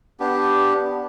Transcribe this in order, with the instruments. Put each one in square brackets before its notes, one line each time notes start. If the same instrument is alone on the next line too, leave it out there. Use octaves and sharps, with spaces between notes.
[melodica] B3 D4 G4